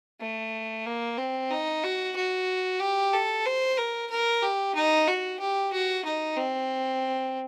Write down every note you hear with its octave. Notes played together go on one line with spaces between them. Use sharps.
A3
A#3
C4
D#4
F#4
F#4
G4
A4
C5
A#4
A#4
G4
D#4
F#4
G4
F#4
D#4
C4